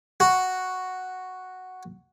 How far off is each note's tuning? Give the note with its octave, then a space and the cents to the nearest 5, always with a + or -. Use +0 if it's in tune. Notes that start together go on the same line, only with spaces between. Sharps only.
F#4 +0